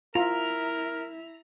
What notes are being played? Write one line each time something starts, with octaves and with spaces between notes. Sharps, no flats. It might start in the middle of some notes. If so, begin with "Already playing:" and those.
E4 F4 A#4 E5 A#5